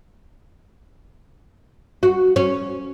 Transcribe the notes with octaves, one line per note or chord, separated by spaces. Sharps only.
F#4
C#4